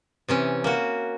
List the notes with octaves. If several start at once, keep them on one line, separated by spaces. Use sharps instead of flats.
C3 E3 C#4
A#3 F#4